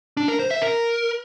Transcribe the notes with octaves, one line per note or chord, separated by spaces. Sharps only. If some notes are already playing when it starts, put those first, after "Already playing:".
D4
A#4
C5
E5
A#4